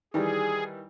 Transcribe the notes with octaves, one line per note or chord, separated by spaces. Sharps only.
D#3 E3 G3 G#4